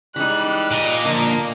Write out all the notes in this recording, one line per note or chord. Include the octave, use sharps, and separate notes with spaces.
E3 G3 G#3 D#4 F#6
A#2 D#5
D3 F3 A#3